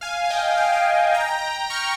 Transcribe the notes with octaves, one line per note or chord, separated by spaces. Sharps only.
F5 G#5
G#5
D#5 G5
G5
G#5
D#5 G5
G5 A#5
C#6 F6